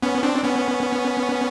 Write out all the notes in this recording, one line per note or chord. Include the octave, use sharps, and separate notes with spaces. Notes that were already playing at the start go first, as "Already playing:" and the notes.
B3 C#4
C4 D4
B3 C#4